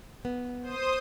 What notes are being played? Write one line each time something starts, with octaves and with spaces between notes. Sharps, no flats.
B3
C5 D#6